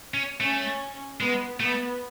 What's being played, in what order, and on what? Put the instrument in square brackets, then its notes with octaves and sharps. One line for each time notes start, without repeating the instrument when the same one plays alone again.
[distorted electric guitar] C#4
[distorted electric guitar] A3 [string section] C#4
[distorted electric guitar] G#3 [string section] B3
[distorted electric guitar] A3 [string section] B3